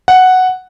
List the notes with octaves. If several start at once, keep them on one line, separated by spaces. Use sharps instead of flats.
F#5